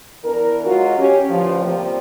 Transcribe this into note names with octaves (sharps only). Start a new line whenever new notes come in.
E3 B3 D4 A#4
F#3 G#3 F4 F#4
C#4 G4
A2 D3 E3 F3
C3 F3 G3 A#3 C4